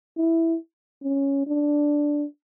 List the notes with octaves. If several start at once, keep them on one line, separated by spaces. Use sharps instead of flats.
E4
C#4
D4